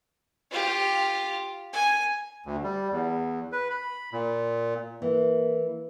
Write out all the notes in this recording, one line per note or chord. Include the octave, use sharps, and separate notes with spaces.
F4 G4
G#5
D2
G3
E2
B4
B5
A#2
E3 A#3